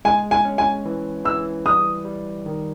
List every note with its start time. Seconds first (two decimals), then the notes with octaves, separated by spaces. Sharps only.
0.05 G#3 G#5
0.31 G#5
0.45 C#4
0.58 G#5
0.85 E3
1.25 E3 E6
1.65 G3 D#6
2.05 G3
2.46 D#3